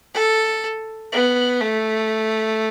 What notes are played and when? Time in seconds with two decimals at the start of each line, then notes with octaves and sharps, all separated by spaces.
0.14 A4
1.13 B3
1.61 A3